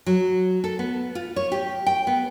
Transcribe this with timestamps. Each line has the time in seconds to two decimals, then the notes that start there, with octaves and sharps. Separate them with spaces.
0.06 F#3
0.64 A4
0.79 B3
1.15 F4
1.36 C#5
1.52 G4
1.86 G5
2.07 B3